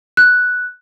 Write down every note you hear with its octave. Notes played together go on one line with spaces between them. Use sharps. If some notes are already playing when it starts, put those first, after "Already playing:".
F#6